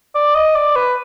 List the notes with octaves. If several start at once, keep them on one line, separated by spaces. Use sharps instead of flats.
D5
D#5
D5
B4